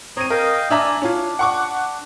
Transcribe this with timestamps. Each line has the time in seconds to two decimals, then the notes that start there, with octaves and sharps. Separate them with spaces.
0.17 C4 C#5 A#5 D#6 D#7
0.30 A#4 D#5 F5 G5
0.70 D4 D5 E5 G#5 A#5 E6
1.02 C#4 D4 F4
1.39 F#5 C#6 D6